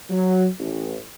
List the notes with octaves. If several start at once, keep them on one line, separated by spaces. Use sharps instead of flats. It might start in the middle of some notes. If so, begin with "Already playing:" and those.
F#3
A1